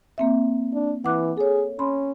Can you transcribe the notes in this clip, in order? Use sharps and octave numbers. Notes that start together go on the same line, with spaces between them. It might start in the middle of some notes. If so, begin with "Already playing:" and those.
A#3 C4 E5
D4
E3 F#5 D6 F#6
G#4 A4 C#5
C#4 B5 C6